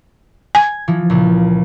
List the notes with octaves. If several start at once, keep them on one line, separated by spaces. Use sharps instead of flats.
G#5 G#6
E3 F3
C#2 A#2